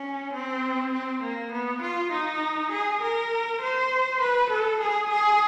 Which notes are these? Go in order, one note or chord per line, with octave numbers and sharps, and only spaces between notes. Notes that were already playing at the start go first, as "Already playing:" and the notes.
Already playing: C#4
C4
C4
A#3
B3
F4
D#4
G#4
A#4
C5
B4
A4
G#4
G#4